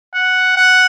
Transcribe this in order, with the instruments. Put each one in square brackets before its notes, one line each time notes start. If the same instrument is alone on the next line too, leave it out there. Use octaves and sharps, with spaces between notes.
[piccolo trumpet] F#5
F#5